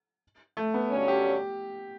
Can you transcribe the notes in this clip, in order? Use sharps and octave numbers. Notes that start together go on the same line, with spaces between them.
A3
B3
G2 D3 F#3 C#4
G4